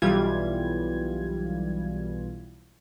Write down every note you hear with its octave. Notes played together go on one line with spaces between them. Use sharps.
B1 E3 G3 F4 G#6